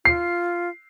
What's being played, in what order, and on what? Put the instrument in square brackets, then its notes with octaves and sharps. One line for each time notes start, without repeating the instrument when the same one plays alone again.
[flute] F4 [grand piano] C7